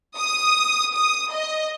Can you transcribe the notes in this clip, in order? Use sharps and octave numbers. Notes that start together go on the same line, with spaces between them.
D#6
D#6
D#5